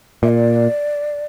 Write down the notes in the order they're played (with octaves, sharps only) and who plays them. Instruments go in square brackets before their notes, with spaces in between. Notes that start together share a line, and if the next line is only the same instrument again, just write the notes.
[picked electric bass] A#2 [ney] E5
[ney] D5